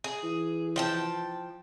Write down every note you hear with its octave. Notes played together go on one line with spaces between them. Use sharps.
G#4
E3
F3 G5 A5